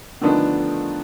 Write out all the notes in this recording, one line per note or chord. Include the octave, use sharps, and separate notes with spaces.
D3 D#3 F3 A3 B3 D4